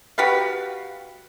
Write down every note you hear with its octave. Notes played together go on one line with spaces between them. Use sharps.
F#4 G4 B4 F5